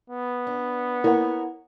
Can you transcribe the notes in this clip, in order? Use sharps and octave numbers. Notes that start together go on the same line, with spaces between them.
B3
D4
A#3 E4 A#4 C#5 F#5